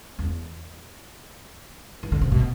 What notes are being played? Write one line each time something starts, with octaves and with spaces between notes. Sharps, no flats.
E2
E3
D3
C3
B2